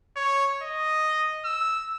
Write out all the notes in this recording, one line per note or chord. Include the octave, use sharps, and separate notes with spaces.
C#5
D#5
E6